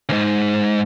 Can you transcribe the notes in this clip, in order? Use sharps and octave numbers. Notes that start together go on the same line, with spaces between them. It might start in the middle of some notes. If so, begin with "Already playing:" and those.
D2 G#2